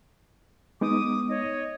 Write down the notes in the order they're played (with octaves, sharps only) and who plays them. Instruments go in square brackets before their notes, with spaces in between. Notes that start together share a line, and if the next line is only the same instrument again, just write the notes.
[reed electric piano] G#3 B3 D#4 [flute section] D6 D#6
[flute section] C#5 D#5